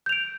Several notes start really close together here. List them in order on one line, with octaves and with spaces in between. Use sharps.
G6 F7 D7